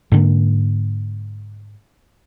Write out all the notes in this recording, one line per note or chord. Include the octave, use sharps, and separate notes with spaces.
G#2 D3 A#3